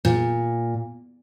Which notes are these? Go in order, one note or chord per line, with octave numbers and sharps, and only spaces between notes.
A#2